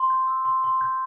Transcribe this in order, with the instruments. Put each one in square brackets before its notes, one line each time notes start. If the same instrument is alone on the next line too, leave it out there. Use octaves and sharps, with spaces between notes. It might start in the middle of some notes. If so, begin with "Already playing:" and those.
Already playing: [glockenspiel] C6
G6
E6
C6
C6
G6